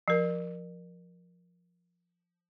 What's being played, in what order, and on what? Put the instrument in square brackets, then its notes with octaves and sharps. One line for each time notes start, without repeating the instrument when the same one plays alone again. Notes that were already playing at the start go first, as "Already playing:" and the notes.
[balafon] F3 A#4